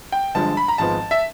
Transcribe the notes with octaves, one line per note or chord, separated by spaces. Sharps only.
G5
G1 G2 D3 F3 G#3 A5
B5
A#5
G#1 G#2 F3 G#3 B3 A5
E5